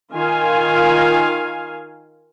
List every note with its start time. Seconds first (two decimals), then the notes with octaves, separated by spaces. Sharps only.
0.12 D#3 F4 F5 G#5